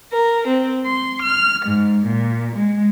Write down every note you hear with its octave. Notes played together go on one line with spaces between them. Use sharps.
A#4
C4
C6
F6
G#2
A#2
G#3